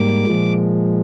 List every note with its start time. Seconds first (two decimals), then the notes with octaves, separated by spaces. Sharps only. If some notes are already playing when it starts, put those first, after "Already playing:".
Already playing: G#2 G3 A#3 D6
0.26 A#2 F3 G#3